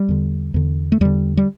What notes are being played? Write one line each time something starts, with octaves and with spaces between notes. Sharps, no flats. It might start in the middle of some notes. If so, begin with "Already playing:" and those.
Already playing: G3
E2 D3
E2 D3
A3
E2 D3 G3
G3